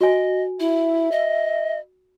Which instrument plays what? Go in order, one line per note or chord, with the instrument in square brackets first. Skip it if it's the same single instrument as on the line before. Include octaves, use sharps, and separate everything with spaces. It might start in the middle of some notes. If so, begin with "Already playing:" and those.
[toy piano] F#4 G#5 [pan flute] D#5
[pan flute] E4 [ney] E5
[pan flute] D#5